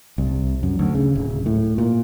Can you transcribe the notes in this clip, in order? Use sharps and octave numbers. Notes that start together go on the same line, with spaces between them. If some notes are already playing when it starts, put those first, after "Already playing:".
C2
F#2
D2
C#3
D1
A2
A#2